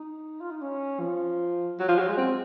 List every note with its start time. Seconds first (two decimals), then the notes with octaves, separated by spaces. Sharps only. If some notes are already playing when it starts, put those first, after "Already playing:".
Already playing: D#4
0.41 F4
0.51 D#4
0.61 C#4
1.00 F3
1.79 F#3
1.88 F3
1.99 F#3
2.09 G#3
2.17 C4